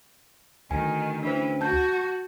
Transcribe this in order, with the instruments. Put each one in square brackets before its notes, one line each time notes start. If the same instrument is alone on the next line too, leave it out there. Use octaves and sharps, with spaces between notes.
[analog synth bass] D2 [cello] D#3 [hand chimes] G#5
[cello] E3 C#4 [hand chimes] D4 C5
[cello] F#4 [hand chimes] A5 G6